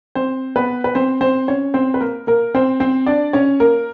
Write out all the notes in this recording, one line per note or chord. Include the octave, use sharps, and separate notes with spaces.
C4 C5
B3 B4
B4
C4 C5
C4 C5
C#4 C#5
C4 C5
B4
A#3 A#4
A#3 A#4
C4 C5
C4 C5
D4 D5
C#4 C#5
A#3 A#4